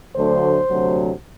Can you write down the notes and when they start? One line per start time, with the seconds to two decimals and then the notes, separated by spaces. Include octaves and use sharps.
0.16 D2 D3 F#3 A3 C5
0.69 D2 C3 F#3